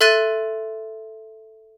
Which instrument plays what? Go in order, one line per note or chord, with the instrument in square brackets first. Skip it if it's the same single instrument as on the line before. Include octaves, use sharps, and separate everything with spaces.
[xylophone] A4 E5 C6 F#6 A6 D#7